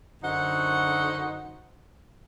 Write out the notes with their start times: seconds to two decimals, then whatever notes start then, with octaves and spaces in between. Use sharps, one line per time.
0.23 F#2 D3 D#4 F#4 C5 F#5